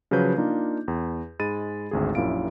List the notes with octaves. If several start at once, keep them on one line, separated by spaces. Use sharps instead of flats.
C#3 F3 F#3 B4 G6
A#3 D4 D#4 F4
E2
G#2 G#3 B5 A6 D#7
G#1 D2 G#4
A#1 F#2 A#2 E4 F5 D7